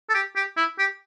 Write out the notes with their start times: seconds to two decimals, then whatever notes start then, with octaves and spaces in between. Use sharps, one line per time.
0.09 A4
0.14 G4
0.36 G4
0.57 E4
0.79 G4